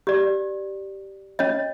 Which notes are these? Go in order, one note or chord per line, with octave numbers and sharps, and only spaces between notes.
G4 D5
C#4 C#5 D#5